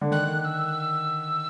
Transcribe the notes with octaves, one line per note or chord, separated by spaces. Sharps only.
D3
D#3 F#6
E6